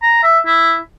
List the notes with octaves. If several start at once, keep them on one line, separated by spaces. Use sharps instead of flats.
A#5
E5
E4